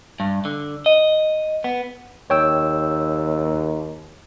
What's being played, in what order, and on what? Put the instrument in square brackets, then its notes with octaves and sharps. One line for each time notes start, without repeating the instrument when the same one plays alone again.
[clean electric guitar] G2
D3
D#5
B3
[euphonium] D#2 [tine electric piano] C#5 G5 E6